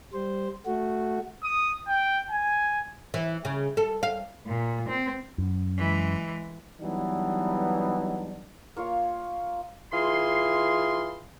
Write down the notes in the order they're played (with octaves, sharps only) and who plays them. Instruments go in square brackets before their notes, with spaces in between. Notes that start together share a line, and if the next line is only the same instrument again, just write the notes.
[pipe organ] G3 C5
A3 F#4
[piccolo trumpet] D#6
G5
G#5
[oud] E3
C#3
A4
F5
[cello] A#2
C4
[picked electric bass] F#2
[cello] E3 G#3
[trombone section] E3 F#3 G3 B3 D4 D#4
[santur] A#3 F4 C#5 F5
[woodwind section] E3 F4 G#4 C6